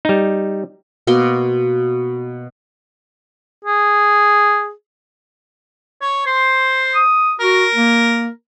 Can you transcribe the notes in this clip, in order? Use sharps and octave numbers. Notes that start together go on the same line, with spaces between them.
G3 D#4
B2 A#3 C6
G#4
C#5
C5 C6
D#6
F#4 A#4
A#3